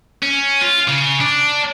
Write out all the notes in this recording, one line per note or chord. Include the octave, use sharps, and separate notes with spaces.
C#4
F4
C#3
D4